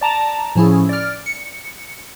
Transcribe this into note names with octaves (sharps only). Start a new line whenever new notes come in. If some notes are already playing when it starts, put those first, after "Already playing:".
D5 A5 A#5
A2 F3 C#4 E4 G#4
D5 F6
C#7